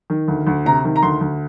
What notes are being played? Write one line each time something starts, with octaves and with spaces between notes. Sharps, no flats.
D#3
D2
D2
C3 A#5
D#3
A#5
D2 C6
D2